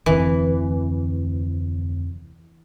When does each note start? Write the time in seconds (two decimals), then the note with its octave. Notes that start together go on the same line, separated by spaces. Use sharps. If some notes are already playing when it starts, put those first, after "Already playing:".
0.06 F1 D2 E3 C4